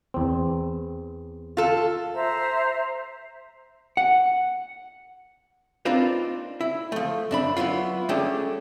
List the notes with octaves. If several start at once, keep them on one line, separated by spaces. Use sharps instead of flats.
E2 C4
F4 A4
C5 E5 A#5
F#5
A#3 C4 D4 D#4 F4 B4
E4
F3 A3
F#2 D4 B5
F#3 B3 E4 F4
G3 A3 C#4 D4 G#4 A4